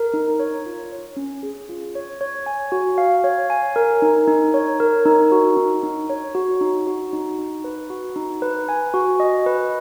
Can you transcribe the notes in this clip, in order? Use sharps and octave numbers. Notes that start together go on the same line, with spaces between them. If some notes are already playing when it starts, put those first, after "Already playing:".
Already playing: A#4
D#4
C#5
F4
C#5
C#4
G#4
F4
C#5
C#5
G#5
F#4
F5
C#5
G#5
A#4
D#4
D#4
C#5
A#4
D#4
F#4
D#4
D#4
C#5
F#4
D#4
F#4
D#4
D#4
B4
F#4
D#4
B4
G#5
F#4
D#5
B4